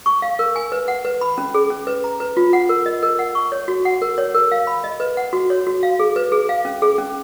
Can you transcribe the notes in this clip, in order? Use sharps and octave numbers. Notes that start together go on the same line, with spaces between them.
C#6
F5
A#4
G#5
B4
F#5
B4
B5
C#4
G#4
C#4
B4
A#5
B4
F4
F#5
A#4
D#5
A#4
F#5
C#6
C#5
F#4
F#5
A#4
C#5
A#4
F5
B5
D#5
B4
F#5
F#4
C#5
F#4
F5
G#4
B4
G#4
F5
C#4
G#4
C#4